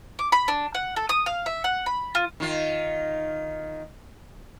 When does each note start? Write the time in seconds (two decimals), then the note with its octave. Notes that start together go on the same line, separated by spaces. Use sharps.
0.19 D6
0.32 B5
0.48 D4
0.75 F#5
0.96 A4
1.09 D#6
1.26 F5
1.46 E5
1.64 F#5
1.86 B5
2.15 F4
2.40 D#3 F4